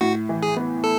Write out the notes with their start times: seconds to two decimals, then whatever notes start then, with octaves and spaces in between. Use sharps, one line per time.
0.01 A2 F#4
0.29 E3
0.43 G#4
0.57 B3
0.84 A4